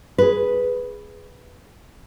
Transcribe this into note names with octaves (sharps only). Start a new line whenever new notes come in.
G#4 B4